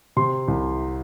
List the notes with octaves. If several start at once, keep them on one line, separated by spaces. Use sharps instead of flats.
C3 C6
C2